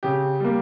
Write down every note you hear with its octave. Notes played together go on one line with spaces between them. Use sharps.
C#3 G4
G3 A#3